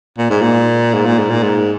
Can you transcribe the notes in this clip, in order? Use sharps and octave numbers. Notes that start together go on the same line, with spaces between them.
A#2
G#2
A#2
G#2
A#2
G#2
A#2
G#2